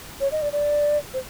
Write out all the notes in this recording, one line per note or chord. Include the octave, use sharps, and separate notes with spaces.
C#5
D#5
D5
D5
C5